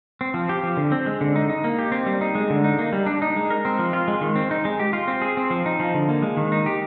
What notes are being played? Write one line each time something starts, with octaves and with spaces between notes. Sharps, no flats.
C4
F3
G4
F3
D3
C4
G#3
D3
D#4
D#4
A#3
G4
C4
G3
D#4
G#3
D3
D#4
A#3
G3
D4
D#4
G#3
A#4
C4
F3
F4
G#3
D#3
C4
D#4
G#3
G4
F4
C4
G#4
C4
F3
D#4
F3
D3
A#3
G#3
D#3
D#4
G4